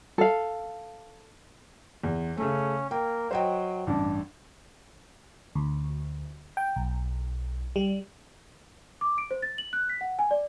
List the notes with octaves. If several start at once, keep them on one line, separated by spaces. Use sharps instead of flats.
A4 F5
E2
C#3 A3 C#4
A#3 G5
F#3 C5 D#5 G5
A1 G2 D4
D2
G5
B1
G3
D6
D7
C5
A6
F#7
F#6
B6
F#5
G#5
D5